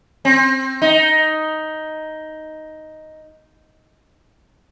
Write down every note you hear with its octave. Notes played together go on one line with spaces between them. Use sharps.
C4
D#4